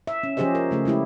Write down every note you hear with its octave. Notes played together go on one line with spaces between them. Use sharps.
E5
C#4
F3 C#4 G4 G#4 C5 D#5
A#4
C#3 A3 G#4
G#3 A3 E4 G4